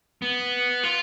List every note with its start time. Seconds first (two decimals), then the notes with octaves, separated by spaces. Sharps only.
0.22 B3
0.84 F4